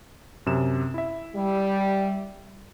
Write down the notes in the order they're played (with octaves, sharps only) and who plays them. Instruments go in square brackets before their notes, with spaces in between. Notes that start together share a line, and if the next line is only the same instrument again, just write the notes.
[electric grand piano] F#2 C3 E7
E4 E5
[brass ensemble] G3